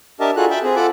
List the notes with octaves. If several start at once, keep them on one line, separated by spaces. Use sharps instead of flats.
D4 G4 A#4 D#5 E5 A5
F4 F#4 G#4 A4 F#6
E5 G5 A5 B5
C4 G#4
F4 A4 F#5 A5 B5 D6